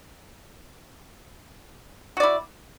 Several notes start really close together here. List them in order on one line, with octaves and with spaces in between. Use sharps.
F#4 D5 E4